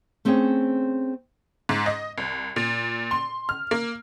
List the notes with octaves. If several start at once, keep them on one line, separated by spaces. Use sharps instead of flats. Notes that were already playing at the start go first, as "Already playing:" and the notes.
A3 C4 C#4 G#4 C#5 G5
G#2
D#5
C2
A#2
C6
F6
A#3